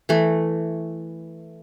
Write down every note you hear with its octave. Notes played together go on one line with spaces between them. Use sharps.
E3 A3